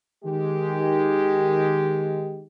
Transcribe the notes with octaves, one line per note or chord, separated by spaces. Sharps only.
D#3 G#3 G4